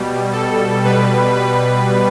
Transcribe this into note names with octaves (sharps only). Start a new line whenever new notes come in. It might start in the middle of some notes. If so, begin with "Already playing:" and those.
Already playing: B2 G3
A4
B2 G3 B4
B4